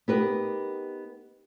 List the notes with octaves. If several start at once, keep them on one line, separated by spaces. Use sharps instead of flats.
B3 D#4 G4 A#4 B4